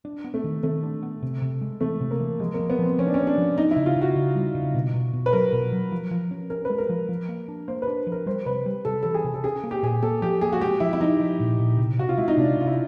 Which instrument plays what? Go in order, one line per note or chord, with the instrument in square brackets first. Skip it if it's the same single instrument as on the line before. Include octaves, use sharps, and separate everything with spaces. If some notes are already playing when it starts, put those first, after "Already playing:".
[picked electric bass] D4
B3
[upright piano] A3
[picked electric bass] D#3
[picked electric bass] D#3 [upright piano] A3
[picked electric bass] D4
B3
C3
C3
G#3
[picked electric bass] E3 [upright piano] A3
[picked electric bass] C3
[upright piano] A#3
[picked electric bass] E3
[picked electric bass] F3 [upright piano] G#3
[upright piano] A#3
[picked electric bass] F3
[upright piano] B3
[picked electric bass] F3 [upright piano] C4
[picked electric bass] F3 [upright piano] C#4
[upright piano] D4
[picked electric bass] A#3 [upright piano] C#4
[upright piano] D4
[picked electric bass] F3
[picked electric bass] B3 [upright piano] D#4
[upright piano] E4
[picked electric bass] C#3
[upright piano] F4
[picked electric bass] C#3
[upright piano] F#4
[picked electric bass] C#3
G3
C#3
B2
B2
B2
[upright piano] B4
[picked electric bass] F#3 [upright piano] A#4
[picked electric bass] B2
F#3
F3
F3
C#4
[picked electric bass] C#4 [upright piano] A#4
[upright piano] B4
[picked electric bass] G#3
[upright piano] A#4
[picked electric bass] F3
F3
A#3
D4
[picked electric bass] A#3 [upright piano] C5
[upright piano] B4
[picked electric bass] D4
F3
[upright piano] A#4
[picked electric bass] G3 [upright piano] C5
[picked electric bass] C3 [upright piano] B4
[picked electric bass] G3
[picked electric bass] C3 [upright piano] A4
[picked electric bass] E3 [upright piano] A4
[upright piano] G#4
[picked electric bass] C3
[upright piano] A4
[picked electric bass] C#4 [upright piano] G#4
[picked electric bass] A#3
[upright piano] G4
[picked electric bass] A#2 [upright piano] G#4
[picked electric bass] A#3 [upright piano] A4
[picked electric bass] F3 [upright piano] G4
[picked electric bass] A#3 [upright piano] G#4
[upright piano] F#4
[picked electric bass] G#3 [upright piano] G4
[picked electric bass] F3 [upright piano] E4
[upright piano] E4
[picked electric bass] F3 [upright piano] D#4
[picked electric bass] F3
A#2
A#2
C3
[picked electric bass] C3 [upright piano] F#4
[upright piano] F4
[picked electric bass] G#3 [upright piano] E4
[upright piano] D#4
[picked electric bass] C3 [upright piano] D4
[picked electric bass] C3 [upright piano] F4
[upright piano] E4